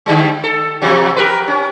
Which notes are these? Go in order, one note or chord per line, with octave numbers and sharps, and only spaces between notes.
D3 G3 G#3
A4
E2 C3 F#3
G4 A#4 B4
C#4